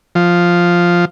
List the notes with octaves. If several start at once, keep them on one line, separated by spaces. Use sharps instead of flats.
F3